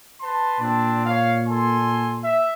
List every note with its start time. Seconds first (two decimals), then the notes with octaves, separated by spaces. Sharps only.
0.21 B4 A5 C6
0.60 A#2 C4 D4
1.06 C#5 F5
1.47 A4 G#5 C6
2.23 E5